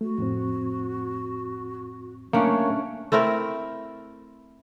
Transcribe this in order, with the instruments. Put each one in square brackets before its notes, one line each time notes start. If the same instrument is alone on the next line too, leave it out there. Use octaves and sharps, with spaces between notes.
[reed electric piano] A3 [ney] F#4
[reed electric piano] F2 A2 C4
[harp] A3 C#4 D4 [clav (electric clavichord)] A#3 [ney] C#5
[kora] A3 C4 E4 A#4